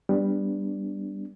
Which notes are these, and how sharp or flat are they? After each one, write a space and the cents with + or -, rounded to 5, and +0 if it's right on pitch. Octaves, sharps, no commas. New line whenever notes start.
G3 +10 B3 +0 D4 +0